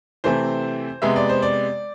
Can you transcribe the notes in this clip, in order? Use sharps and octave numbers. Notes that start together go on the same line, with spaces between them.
C3 E3 A3 C4 C5
C3 G#3 B3 E5
D5
C5
D5